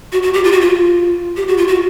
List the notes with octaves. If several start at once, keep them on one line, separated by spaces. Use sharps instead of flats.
F#4
F#4
G4
F4
F#4
F4
G4
F#4
F4
F#4